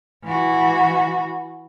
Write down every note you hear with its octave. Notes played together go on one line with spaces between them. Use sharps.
E3 F#4